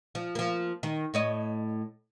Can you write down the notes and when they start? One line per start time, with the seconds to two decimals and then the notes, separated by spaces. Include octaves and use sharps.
0.15 F3
0.35 F3 A#3
0.83 D#3
1.14 A2 C#5 D#5